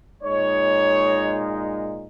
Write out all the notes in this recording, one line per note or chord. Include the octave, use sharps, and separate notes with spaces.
A#2 G#3 D#4 C#5